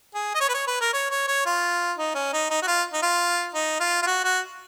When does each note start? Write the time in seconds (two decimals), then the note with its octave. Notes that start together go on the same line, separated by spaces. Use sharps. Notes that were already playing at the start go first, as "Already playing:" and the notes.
0.14 G#4
0.34 D#5
0.40 C#5
0.49 B4
0.54 C#5
0.67 B4
0.81 A#4
0.93 C#5
1.11 C#5
1.28 C#5
1.46 F4
1.98 D#4
2.15 C#4
2.33 D#4
2.50 D#4
2.62 F#4
2.67 F4
2.93 D#4
3.02 F4
3.54 D#4
3.80 F4
4.02 F4
4.07 F#4
4.24 F#4